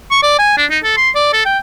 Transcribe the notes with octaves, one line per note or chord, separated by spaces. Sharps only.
C#6
D5
G#5
D4
D#4
A4
C6
D5
A4
G5